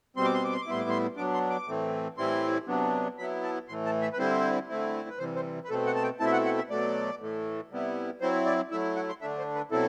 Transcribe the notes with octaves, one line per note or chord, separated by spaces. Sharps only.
B2 G3 C4 C6
D6
C6
D6
C6
D6
A2 G3 B3 E4 C6
D6
C6
F#3 B3 D4 D6
C6
D6
A2 E3 A3 C4
A2 E3 G3 C4 E4 C6
C3 F#3 B3 D4
F#3 B3 E4 B5
A5
A2 E3 A3 C6
A5
E5
B4
D3 G3 C4 E4 C5
D3 A3 C4 E4
B4
C3 E3 G3 C5
C5
B4
B2 A3 C4 A4
F#5
A5
G5
B2 A3 C4 E4 A5
E5
F#5
F#5
E5
B2 F#3 A3 D5
A2 E3 A3
C3 G3 B3 E4
F#3 C4 E4 C5
D5
F#3 A3 E4 E5
F#5
C6
D3 A3 D4 E5
C5
B4
B2 F#3 C4 E4 A4